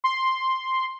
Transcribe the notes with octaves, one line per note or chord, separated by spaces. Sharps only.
C6